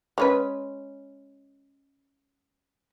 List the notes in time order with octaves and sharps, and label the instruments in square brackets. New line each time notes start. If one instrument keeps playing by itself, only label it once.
[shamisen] G#3 C#4 B4